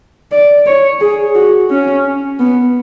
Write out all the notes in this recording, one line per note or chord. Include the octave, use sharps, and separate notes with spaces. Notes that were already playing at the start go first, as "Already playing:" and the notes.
D5
C#5
G#4
F#4
C#4
B3